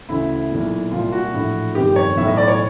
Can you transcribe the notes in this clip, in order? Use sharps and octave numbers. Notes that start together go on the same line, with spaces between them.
D2 C#3 E3 E4
B1 A#2
C2 A#2 F4
F#4
A#1 A2 E3
G1 F2 C3 D#3 G4
C#5
B1 A2 E3 E5
D#5
D5
C#5